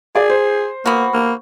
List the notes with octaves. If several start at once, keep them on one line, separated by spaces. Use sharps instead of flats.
G#4 D5
C5
A#3 B3 F#4
A#3